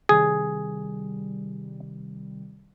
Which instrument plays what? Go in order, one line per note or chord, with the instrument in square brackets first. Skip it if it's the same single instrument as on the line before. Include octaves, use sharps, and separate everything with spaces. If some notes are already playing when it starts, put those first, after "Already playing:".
[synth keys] C3 D#3 G3 [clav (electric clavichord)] G#4